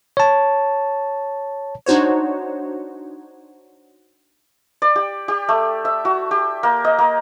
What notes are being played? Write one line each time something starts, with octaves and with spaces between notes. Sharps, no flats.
C#5 A5
D4 D#4 F#4 C5 C#5
D5
G4
G4
A3
E5
F#4
G4
A#3
D#5
A#3